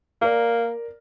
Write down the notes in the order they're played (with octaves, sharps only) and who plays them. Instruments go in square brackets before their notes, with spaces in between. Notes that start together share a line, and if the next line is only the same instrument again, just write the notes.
[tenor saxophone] A#3 [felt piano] A#4 D5